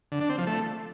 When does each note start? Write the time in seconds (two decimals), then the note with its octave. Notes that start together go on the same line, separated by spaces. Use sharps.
0.12 D3
0.21 D4
0.29 C4
0.38 F3
0.47 A3